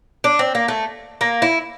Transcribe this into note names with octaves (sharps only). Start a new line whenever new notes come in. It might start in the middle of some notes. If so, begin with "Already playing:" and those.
D4
C4
A#3
A3
A#3
E4